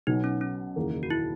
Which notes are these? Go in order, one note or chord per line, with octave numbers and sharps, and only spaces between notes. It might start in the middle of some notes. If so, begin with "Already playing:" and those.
B1 B2 F#3 B3 D#4
C#4
C#4
F#1 E2 D#3 A#3
F#4
E4